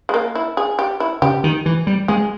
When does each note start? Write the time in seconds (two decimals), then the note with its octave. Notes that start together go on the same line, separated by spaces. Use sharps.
0.09 G#3
0.14 A#3
0.35 E4
0.57 G#4
0.79 G4
1.00 E4
1.22 C#3 G4
1.44 D#3
1.66 E3
1.87 G3
2.08 G#3 G#4